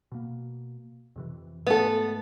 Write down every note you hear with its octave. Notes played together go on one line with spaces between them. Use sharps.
B2 A#3
F2 C3 E3
G#2 G#3 A3 B3 A4